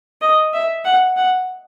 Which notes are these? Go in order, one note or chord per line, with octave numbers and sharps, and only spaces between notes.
D#5
E5
F#5
F#5